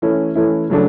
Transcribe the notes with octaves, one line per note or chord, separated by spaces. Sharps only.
E3 A3 C#4 E4
E3 A3 C#4 E4
C#3 F#3 A3 D4